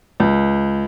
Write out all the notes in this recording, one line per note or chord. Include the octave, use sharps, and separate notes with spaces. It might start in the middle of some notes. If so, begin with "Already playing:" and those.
C#2